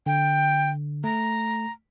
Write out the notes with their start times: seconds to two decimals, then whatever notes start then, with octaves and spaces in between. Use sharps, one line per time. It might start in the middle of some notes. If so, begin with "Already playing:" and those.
0.06 D3 G5
1.04 A3 A#5